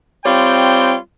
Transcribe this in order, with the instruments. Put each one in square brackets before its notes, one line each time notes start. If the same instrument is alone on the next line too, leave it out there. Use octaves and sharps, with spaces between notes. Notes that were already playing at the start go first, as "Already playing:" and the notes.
[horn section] G3 C4 F4 C#5 G5